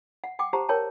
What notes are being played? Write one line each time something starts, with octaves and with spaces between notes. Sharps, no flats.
F#5
F#5 G5 D6
G4 C5 F#5 A5 A#5
A#4 C#5 G5 A5